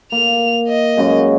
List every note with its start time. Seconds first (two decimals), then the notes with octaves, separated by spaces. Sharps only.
0.12 A#3 F7
0.68 D#5
0.97 F#2 C#3 G#3